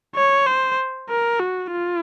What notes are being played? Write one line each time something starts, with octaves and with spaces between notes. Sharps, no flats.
C#5
C5
A#4
F#4
F4